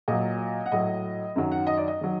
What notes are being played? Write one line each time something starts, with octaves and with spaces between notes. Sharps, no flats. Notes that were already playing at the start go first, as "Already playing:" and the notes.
A#2 F#3 D#5
F#5
A2 F#3 D#5
F#2 D#3 F#3
F#5
D#5
D5
D#5
D#3 F#3